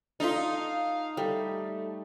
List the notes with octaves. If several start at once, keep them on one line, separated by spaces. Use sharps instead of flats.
D#4 F4 A4 F5
G3 A3